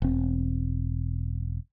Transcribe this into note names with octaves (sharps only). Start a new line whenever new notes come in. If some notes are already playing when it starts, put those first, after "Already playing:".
E1 C4